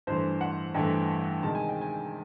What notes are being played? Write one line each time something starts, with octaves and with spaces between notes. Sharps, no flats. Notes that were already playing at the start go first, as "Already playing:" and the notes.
G2 E3 A3 C5
F#5
G2 E3 A3 G5
C3 D#3 G#3 A5
G#5
G5
G#5